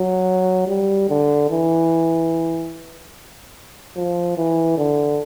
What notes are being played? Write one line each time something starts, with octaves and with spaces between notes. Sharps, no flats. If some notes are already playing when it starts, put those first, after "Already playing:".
Already playing: F#3
G3
D3
E3
F3
E3
D3